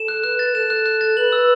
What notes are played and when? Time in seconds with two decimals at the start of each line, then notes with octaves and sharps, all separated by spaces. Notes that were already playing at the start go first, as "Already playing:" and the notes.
Already playing: A4 E7
0.08 F#6
0.24 B4 F#6
0.39 A6
0.54 A4 E7
0.70 F#6
0.86 F#6
1.01 A6
1.17 B4 F#7
1.33 E6